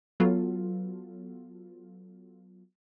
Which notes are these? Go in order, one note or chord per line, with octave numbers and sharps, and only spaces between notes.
F#3 B3 F4 A4